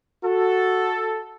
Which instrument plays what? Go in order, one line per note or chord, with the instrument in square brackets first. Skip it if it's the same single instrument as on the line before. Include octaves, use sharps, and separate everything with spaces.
[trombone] F#4 [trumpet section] A4